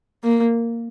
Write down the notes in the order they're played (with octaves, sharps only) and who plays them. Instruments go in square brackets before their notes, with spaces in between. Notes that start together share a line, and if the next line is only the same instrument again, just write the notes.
[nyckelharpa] A#3